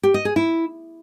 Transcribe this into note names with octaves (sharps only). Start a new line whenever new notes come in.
G4
D#5
G#4
E4